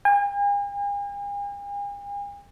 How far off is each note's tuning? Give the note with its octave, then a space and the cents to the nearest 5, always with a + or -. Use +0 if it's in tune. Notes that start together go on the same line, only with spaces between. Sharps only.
G#5 -45